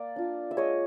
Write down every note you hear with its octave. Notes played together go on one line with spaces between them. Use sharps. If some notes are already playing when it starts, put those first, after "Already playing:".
Already playing: A#3 D5
D4 F4
E5
G#3 C#5 D#5